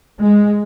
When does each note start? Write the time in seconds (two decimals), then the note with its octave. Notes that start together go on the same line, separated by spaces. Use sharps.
0.19 G#3